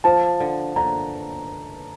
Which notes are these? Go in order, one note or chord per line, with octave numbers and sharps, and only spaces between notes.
F3 A5
D3
D3 A#5